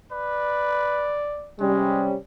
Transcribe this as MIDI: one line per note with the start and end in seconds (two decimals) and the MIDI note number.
0.12 1.21 71
0.12 1.53 74
1.59 2.14 48
1.59 2.14 55
1.59 2.05 56
1.59 2.14 61